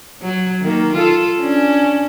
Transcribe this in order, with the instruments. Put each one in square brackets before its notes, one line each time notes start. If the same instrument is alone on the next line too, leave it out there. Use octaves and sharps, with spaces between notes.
[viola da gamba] F#3
D#3 A#3
F4 A4
C#4 D4